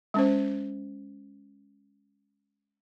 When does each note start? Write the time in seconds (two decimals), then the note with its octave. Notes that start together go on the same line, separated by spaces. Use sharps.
0.14 G#3 C#4 C5